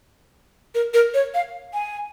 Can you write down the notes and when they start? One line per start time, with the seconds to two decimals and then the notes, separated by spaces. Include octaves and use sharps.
0.75 A#4
0.94 A#4
1.14 C#5
1.34 F5
1.74 G#5